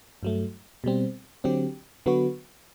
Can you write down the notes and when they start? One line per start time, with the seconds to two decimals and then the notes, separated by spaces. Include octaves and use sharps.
0.23 G2 F#3 A3
0.84 B2 G3 C4
1.44 D3 F#3 C4 G4
2.06 D3 F#3 B3 F#4 B4